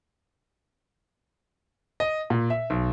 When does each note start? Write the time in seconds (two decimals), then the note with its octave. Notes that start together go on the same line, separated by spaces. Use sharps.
2.00 D#5
2.30 A#2
2.50 E5
2.70 B1